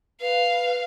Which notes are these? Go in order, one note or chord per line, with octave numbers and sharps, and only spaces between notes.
B4 F5